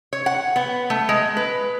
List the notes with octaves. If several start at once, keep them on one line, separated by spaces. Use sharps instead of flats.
C#5
F#5
B3
A3
G#3
B4